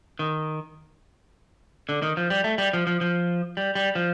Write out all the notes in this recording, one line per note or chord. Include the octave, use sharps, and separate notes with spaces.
D#3
D3
D#3
F3
G3
A3
G3
F3
F3
F3
G3
G3
F3